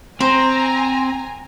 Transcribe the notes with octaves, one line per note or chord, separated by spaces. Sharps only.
C4 C5 G#5 A#5